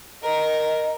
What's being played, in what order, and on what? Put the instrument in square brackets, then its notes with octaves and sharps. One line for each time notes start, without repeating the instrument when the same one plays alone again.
[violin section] A#4 [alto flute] D#5